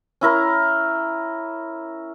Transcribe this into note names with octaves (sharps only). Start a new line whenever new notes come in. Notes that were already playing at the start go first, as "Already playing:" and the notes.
C#4 E4 A#4